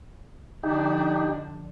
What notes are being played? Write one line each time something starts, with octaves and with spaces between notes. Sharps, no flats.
D3 F3 D4 D#4 G4